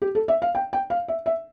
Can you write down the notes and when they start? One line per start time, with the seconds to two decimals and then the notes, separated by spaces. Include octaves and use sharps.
0.02 G4
0.15 A4
0.28 E5
0.42 F5
0.55 G5
0.73 G5
0.90 F5
1.08 E5
1.26 E5